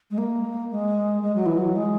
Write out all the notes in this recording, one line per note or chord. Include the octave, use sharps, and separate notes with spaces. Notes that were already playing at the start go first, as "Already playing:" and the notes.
G#3
A#3
G#3
G#3
F#3
E3
F#3
G#3